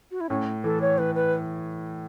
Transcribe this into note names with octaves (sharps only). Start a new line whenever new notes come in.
F#4
E4
A2 C#4
E3 A4
C#5
E3 B4
B4